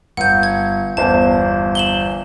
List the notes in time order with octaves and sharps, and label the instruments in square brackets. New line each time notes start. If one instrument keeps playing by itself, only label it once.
[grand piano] G1 [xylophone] F#5 G6
[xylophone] G#6
[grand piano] G1 E2 C5 [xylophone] A5
[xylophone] E7 F#7 G7